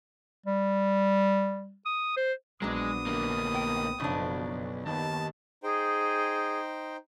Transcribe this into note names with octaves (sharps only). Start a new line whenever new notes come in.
G3
D#6
C5
A#1 F#3 G#3 B3 D4 D#6
D2 A#3
G5
F#1 B1 C#3 F3 D4
D#2 B3 A5
D#4 G#4 C5 G5